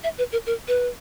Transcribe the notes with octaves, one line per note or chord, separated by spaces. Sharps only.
E5
B4
A#4
A#4
B4